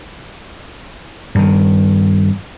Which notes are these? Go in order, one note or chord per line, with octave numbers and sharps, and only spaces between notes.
G2 D#3